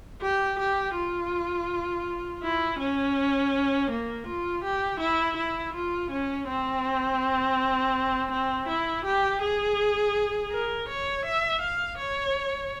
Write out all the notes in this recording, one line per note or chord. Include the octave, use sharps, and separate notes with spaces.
G4
G4
F4
E4
C#4
A#3
F4
G4
E4
E4
F4
C#4
C4
C4
E4
G4
G#4
A#4
C#5
E5
F5
C#5